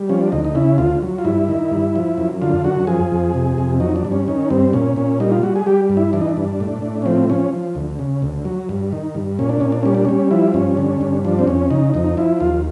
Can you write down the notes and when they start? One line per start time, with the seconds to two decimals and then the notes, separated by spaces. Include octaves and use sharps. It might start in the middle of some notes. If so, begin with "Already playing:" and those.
Already playing: G3
0.09 F3 C#4
0.21 D4
0.32 D2 D#4
0.44 D#4
0.55 C#3 E4
0.78 D2 F4
1.02 F#3
1.18 F4
1.25 G2 E4
1.48 D#3
1.71 G2
1.96 F3
2.18 F#2
2.42 D3 F4
2.64 F#2 F#4
2.87 F3 G#4
3.12 F2
3.34 C3
3.58 F2
3.80 F#3 D#4
3.96 D4
4.05 G2
4.12 C#4
4.28 D#3 C#4
4.50 G2 C4
4.73 A#2 C#4
4.96 A#2 C#4
5.20 G3 D#4
5.32 F4
5.43 G3 F#4
5.56 G#4
5.66 G3 G4
5.90 G2
5.97 E4
6.13 E3 D4
6.21 D#4
6.29 D4
6.37 G2
6.60 A2
6.82 A2
7.02 C#4
7.05 F3 C4
7.30 F3 C#4
7.53 F3
7.75 D2
7.99 C#3
8.22 D2
8.45 F#3
8.69 G2
8.93 D#3
9.15 G2
9.39 A#2 C#4
9.49 D4
9.60 A#2 C#4
9.72 D4
9.83 G3 C#4
9.95 D4
10.05 G3 C#4
10.31 F3 E4
10.54 G2 C#4
10.77 D3
11.01 G2
11.25 F3 D4
11.39 C4
11.47 F2 C#4
11.70 C#3 D#4
11.94 F2 D#4
12.17 F3 E4
12.40 D#2 F4